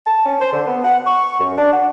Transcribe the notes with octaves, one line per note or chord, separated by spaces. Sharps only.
A5
C#4
C5
D3
B3
F#5
C#6
F#2
D4
F#5